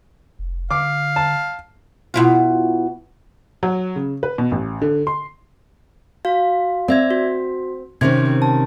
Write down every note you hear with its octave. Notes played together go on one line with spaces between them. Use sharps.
F1
D3 F5 D6
A5
B2 E4 F4
F#3
C#3
B4
B2
A1
D3
C6
F#4 F5
C4 D5 E5 G#6
F#4
C3 D#3 C#4 C5 G#6
A5